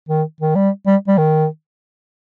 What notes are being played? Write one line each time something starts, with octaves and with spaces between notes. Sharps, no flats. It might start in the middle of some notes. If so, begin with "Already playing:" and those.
D#3
D#3
G3
G3
G3
D#3